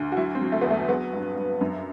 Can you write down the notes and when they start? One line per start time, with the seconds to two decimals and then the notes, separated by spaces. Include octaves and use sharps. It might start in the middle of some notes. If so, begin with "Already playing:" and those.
Already playing: D2
0.12 F#4
0.17 F#3 E4
0.35 C4
0.41 F#3
0.52 A3
0.61 E2 B3
0.70 A3
0.89 F#3 B3
1.13 G2
1.36 G2
1.61 F#2